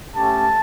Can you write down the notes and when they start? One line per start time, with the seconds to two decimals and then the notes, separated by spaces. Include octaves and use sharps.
0.16 A3 C#4 G4 A5